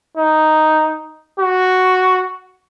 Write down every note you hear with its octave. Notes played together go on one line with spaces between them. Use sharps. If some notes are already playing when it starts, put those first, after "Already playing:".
D#4
F#4